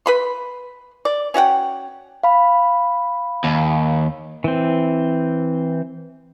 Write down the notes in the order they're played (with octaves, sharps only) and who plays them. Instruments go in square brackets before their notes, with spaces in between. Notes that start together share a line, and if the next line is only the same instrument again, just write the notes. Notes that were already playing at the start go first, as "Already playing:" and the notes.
[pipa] B4 B5 C6
D5
C#4 F#4 F#5 G5
[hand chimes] F5 B5
[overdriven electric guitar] D#2
[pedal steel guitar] E3 C4